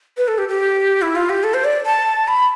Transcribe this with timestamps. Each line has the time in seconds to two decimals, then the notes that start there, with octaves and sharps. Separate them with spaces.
0.17 B4
0.28 A4
0.38 G4
0.49 G4
1.02 E4
1.16 F4
1.29 G4
1.44 A4
1.54 C5
1.64 D5
1.86 A5
2.28 B5